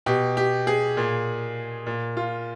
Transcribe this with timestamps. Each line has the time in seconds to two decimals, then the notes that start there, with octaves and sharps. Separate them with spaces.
0.06 B2 G4
0.37 G4
0.67 G#4
0.97 A#2
1.87 A#2
2.17 F4